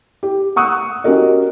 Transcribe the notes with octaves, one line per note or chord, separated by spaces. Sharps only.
G4
F#5 C#6 D#6 E6 F#6
C#4 F#4 G4 A#4 D#5